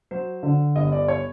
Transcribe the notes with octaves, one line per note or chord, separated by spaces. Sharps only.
F#3 C5
D3
G1 D#5
D5
C#5